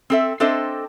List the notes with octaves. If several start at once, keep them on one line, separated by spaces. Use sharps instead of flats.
C4 A4 E5
C4 D4 A4 C5 D#5 E5